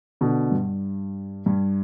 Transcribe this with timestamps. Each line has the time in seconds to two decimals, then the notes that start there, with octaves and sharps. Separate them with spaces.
0.21 B2 D3
0.51 G2
1.46 G2